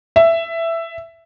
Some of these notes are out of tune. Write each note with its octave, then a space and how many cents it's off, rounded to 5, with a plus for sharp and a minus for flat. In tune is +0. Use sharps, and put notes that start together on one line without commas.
E5 +10